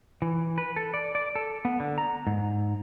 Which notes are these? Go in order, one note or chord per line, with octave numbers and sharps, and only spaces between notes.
E3
B4
A4
D5
D5
A4
B3
D3
A#5
G#2